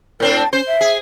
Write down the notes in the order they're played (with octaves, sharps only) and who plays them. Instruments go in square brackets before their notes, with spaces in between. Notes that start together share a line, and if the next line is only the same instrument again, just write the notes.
[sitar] A2 C4 D4 [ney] A#4
[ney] A5
[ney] C#4 [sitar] C5
[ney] E5
[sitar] G#4